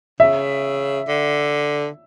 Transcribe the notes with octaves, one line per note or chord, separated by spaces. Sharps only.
C#3 E5
D3